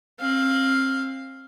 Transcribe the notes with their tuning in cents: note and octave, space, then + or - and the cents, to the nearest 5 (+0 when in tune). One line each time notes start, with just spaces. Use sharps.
C4 +35 F5 +0